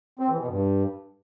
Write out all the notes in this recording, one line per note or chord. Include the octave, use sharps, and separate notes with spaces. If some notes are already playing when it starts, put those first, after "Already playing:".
C4
E3
B2
G2